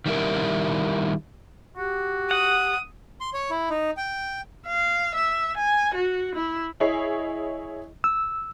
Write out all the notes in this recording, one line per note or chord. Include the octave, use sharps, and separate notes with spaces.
D#3 G3 E4 A#4
F#4 G4
F#5 D#6
C6
C#5
E4
D#4
G5
F5
E5
G#5
F#4
E4
E4 G#4 C#5 D#5 C7
E6